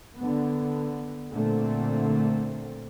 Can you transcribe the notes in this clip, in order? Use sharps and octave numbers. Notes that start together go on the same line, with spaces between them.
D3 B3
A#2 D3 A3 C4